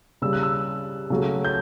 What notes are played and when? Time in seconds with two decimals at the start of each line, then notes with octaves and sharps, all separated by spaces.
0.22 C#3 G3 E6
0.33 F#6
0.43 E6
1.10 C#3 F#3 A3
1.45 G6